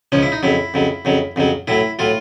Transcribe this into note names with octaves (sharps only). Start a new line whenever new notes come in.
C#2 C#3 F3 C#4
E4
D#4
F2 C#3 F#3 E4
F2 C#3 F#3
F2 C#3 F#3
F2 C#3 F#3
A2 F#3 E4
A2 F#3 F4